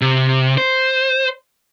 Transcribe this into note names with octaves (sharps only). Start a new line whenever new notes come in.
C3
C5